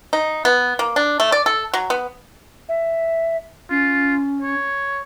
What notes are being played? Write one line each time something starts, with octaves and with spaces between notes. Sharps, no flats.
D#4
B3
A#3
D4
A3
D5
A4
F#3
B3
E5
C#4 F4
C#5